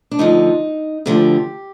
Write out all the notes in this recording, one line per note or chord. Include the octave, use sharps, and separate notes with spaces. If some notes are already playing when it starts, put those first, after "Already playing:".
D4
D2 D3 F3 D#4
D2 D3 F3 G4